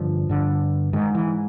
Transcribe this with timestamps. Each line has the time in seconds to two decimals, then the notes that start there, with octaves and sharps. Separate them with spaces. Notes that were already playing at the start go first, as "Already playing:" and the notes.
Already playing: G2 D3 F3
0.29 G2 D3
0.93 G#2 D#3
1.15 E3